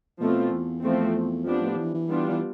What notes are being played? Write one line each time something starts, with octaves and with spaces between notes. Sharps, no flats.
B2 F3 A3 C4 F4
E2
F3 A3 C4
F2 F3 B3 D4 G4
A2
E3
E3
G3 B3 D4 F4
E3